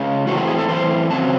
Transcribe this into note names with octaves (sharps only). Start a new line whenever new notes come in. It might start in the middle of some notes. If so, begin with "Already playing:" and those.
Already playing: C#3 G#3
A2 E3 C4 F#4
F#4
G#4
A4
A2 E3 C4 C5
C#3 F#3 C4 A5